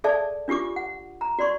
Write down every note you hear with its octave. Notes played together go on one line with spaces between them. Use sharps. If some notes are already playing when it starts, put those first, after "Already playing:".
G#4 A4 D5 E5 A5
D4 F4 G4 C#6 D6
F#5
A#5
F#4 D5 C6 C#6